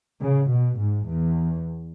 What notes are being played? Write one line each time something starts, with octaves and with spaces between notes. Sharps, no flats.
C#3
B2
G#2
E2